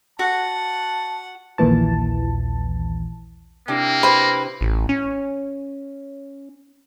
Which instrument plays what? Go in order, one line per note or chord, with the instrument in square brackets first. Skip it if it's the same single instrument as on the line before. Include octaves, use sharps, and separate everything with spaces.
[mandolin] F#4 [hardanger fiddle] F#5 [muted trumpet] A5
[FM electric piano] A#1 D#2 A#2 E3 A5
[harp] C3 D4 E4 [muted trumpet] A#3
[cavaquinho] B4 C5 [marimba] B5
[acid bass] A1
C#4